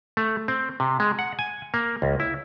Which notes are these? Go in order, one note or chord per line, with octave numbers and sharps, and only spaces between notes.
A3
C4
C3
G#3
F#5
G#5
A#3
C#2
E4